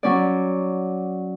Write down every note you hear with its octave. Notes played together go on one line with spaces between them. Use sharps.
F#3 C#4 D5